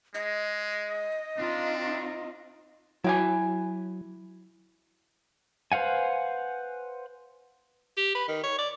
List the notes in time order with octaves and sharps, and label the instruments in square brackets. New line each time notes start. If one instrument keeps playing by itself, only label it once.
[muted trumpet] G#3 [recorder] D#5
[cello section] C4 D#4 F4 [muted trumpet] D4
[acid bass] F#3 [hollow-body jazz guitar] E4 G5 G#5
[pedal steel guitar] B4 C5 F5 F#5 G#5
[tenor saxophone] G4
B4
D#3
C#5
D5